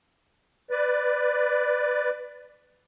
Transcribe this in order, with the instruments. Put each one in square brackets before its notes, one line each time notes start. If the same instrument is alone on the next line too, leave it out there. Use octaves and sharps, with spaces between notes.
[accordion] B4 D5